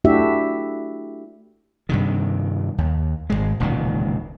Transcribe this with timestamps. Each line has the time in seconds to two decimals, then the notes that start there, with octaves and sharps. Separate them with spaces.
0.04 A3 D4 E4 F#4 G4 E5
1.89 G2 C3 D#3
2.78 D#2
3.30 G#1 C#2 G#3
3.60 E1 C#2 A#2 D#3